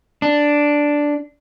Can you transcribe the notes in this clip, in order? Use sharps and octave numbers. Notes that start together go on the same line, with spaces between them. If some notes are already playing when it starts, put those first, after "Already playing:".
D4